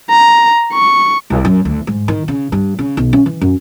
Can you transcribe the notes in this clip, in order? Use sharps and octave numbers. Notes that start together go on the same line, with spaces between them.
A#5
C#6
C2
F#2
D2
G#2
D#3
C#3
G2
C#3
B1
C#4
E3
F#2